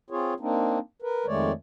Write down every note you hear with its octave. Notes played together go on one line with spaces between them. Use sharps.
C4 F4 G#4 C#5
A#3 C4 D4 D#4
A#4 B4
F2 D#3 G#3 A3 C#5 D5